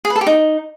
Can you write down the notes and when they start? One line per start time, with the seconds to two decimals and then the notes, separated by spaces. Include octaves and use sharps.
0.05 G#4
0.10 B4
0.16 A4
0.21 G4
0.27 D#4